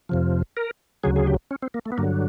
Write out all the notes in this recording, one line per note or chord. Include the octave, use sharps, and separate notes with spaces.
F2 C3 F3
A#4
D2 C#3 F#3 G#4
G#4
G4
C#4
C4
A#3
A3
B3
G2 D3 F#3 A#3